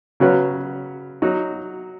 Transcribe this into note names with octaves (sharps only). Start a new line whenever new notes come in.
C#3 F#3 C#4 F#4 B4
F#3 D#4 F#4